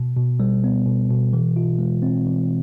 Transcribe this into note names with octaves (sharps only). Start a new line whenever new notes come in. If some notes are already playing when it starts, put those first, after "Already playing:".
Already playing: B2
B2
G3
B3
B2
B2
E3
F4
G#3
C4
E3